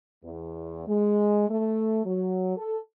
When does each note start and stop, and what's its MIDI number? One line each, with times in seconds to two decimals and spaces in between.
0.24 0.85 40
0.87 1.47 56
1.49 2.01 57
2.05 2.54 54
2.57 2.79 69